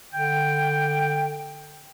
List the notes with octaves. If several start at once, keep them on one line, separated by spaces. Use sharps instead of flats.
D3 G5